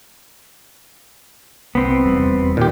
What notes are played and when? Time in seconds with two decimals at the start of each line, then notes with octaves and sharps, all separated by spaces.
1.75 C2 B3 C4
2.05 F1 E2 G3
2.57 A#2 D#3 G4